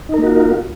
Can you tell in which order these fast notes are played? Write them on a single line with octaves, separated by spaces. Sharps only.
D#4 A#4 A#3 F#4 F4